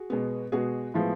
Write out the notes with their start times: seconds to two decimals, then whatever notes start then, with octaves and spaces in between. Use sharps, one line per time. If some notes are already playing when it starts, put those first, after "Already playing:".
Already playing: F#4 G#4
0.10 B2 G#3 B3
0.52 B2 G#3 B3 F#4 G#4
0.94 A2 F3 G#3 B3